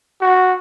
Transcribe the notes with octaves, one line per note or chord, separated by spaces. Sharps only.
F#4